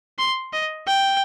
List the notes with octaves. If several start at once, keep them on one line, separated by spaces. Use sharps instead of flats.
C6
D#5
G5